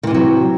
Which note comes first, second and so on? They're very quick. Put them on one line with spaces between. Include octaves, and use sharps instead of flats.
D#3 E3 C3 F#3